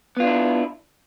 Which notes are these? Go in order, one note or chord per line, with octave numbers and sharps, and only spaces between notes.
B3 D4 E4 F4